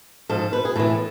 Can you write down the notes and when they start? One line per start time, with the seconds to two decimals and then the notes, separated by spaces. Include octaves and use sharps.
0.30 G#2 F3 A4
0.53 B4
0.65 G#4
0.76 A2 E3 A4